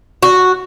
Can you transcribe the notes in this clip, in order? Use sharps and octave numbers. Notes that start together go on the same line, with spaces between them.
F#4